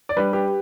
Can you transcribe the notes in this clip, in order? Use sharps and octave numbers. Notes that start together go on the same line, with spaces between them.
D5
G3 D4 G4 B4
G4 B4